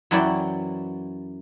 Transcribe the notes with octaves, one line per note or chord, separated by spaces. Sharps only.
F#2 E3 F#3 E4 D5 G5